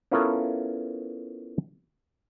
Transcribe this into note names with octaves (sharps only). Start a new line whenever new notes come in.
B3 C#4 E4 F4 A4 A#4